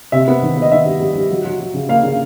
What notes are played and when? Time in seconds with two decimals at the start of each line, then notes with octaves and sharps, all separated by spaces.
0.12 C3 E5
0.28 B3
0.43 D#3
0.57 B3 D#5
0.72 D#3 E5
0.86 G3
1.00 G3
1.15 G3
1.31 F#3
1.44 F#3
1.60 F#3
1.74 C#3
1.89 A#3 F5
2.03 C#3